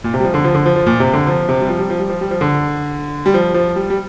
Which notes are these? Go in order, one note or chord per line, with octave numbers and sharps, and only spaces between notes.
A#2
C3
G3
F3
D3
F3
D3
F3
F3
A#2
C3
D3
F3
C3
G3
F3
G3
F3
G3
F3
G3
F3
D3
G3
F3
F3
G3
G3